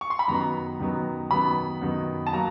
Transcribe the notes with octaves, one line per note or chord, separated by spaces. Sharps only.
C#6
C6
B5
F#2 D#3 F#3 B3 A#5
F#2 D#3 F#3 B3
F#2 D#3 F#3 B3 B5
F#2 D#3 F#3 B3
A5
F#3 A#3 A#5